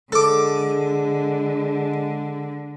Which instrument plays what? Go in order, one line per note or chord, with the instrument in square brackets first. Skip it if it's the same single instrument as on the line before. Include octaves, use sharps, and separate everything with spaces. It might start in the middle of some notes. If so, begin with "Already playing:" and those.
[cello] D3 [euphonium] G#3 [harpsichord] A4 D6